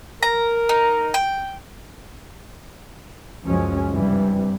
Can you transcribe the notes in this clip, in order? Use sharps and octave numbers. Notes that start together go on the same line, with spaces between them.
A#4 A#5
D#4
G5
C#2 F#2 F3 F#3 G#3 C#4
G2 C3 E3 G3